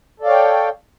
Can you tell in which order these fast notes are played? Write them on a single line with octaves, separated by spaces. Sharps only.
A4 D5 F5 C#5 G5